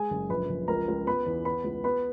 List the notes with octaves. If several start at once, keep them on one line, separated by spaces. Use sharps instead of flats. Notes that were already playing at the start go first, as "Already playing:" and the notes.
Already playing: G#3 G#4 G#5
F#1
A#1 B4 B5
A#1
C#2 A#4 A#5
C#2
B3 B4 B5
E2
B3 B4 B5
C#2
B3 B4 B5